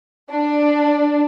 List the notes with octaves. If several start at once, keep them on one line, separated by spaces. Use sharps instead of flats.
D4